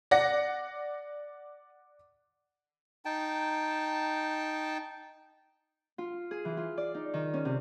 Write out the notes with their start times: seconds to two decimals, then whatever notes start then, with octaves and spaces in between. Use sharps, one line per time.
0.11 D5 F#5 A#6
3.05 D#4 G5 A5
5.98 F4
6.31 G#4
6.45 E3
6.57 F4
6.78 D5
6.94 D#4
7.14 D#3
7.34 C#4
7.45 C3